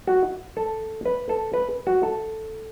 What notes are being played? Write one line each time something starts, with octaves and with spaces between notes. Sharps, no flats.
F#4
A4
B4
A4
B4
F#4
A4